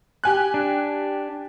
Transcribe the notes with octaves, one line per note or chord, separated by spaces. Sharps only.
G4 G#5 F#6
D4